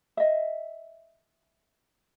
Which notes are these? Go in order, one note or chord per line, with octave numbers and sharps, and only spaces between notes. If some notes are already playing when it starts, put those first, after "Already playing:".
D#5 E5